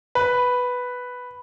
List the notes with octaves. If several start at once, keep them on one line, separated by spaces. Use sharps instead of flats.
B4